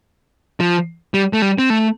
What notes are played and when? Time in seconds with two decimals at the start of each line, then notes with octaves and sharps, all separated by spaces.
0.60 F3
1.14 G3
1.33 A3
1.42 G3
1.58 C4
1.70 A3